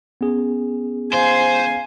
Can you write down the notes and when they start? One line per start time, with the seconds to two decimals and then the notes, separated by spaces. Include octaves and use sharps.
0.21 B3 C#4 G#4
1.13 C5 F5 G#5